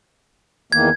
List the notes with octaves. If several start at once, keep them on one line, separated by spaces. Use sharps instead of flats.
E2 D#3 A#3 G#6